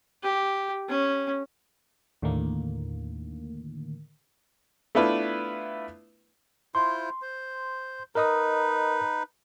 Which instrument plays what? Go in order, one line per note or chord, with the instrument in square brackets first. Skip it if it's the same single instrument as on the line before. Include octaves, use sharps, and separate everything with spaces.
[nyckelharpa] G4
C#4
[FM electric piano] D#2 A2 D3 D#3 A#3
[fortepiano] A3 B3 D4 E4 F4 B4
[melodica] E4 F4 C5 [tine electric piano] C6
[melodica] C5
[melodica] D#4 B4 [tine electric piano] A#4 D#5 D#6